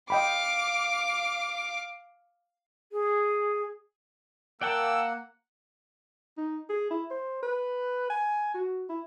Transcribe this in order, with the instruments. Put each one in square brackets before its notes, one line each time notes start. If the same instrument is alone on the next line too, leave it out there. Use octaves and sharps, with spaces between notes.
[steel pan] D#5 G5 B5 [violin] F5 D6
[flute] G#4
[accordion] A#3 [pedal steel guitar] D5 G5 A5 [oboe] F#5 [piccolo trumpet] E6
[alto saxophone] D#4
G#4
E4
C5
B4
G#5
F#4
E4